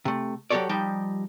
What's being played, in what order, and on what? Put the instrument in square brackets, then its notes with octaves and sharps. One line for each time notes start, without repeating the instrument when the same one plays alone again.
[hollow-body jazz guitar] C3 A3
F#3 F#4 G4 A4 C#5 D5
F3 G3 D#4 G4 G5